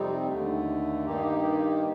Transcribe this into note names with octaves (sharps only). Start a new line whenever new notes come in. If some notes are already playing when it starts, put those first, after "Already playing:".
Already playing: F2 C3 G3 C4 D#4
D#2 D3 A3
G2 D#3 A#3 D#4 G4